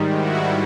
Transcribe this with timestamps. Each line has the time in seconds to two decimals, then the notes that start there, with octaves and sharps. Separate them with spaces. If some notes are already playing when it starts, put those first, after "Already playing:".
Already playing: G#2 D#3 G3
0.16 E4 F#4